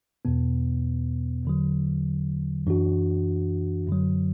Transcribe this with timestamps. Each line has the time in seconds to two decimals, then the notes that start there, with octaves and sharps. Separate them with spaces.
0.25 E2 B2 B3
1.45 E2 D3 F#3
2.67 F#2 E3 D4 F#4
3.87 F#2 D3 F#3